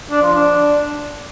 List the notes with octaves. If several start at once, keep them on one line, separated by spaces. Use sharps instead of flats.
D4
F3
D4